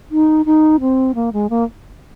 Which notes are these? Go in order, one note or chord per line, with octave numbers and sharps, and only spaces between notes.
D#4
D#4
C4
A#3
G#3
A#3